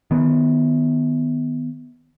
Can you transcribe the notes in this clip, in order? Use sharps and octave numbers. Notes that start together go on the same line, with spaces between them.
D#3 B3